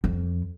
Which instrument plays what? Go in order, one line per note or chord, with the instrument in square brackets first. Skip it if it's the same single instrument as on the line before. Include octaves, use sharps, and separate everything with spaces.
[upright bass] F2